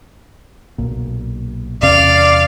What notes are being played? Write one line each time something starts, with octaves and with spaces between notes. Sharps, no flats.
B1 A#2
E2 C3 C#4 D5 F5